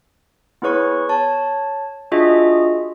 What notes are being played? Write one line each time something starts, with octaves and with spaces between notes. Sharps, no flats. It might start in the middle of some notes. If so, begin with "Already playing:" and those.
B3 E4 G#4 B4 C#5 C#6
C#5 A5
D4 F4 F#4 G#4 D#5 E5